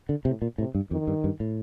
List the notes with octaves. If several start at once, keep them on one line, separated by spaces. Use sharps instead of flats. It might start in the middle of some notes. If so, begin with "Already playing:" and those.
D3
A2 C3
A#2
A2 C3
G2
F2 D#3
G2
G2
A2